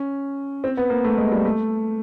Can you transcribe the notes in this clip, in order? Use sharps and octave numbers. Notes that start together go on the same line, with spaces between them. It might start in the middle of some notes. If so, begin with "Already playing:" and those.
Already playing: C#4
C4
B3
A#3
A3
G#3
G3
A3